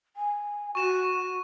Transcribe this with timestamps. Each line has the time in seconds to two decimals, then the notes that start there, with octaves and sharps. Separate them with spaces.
0.16 G#5
0.75 F#4 C#6 E7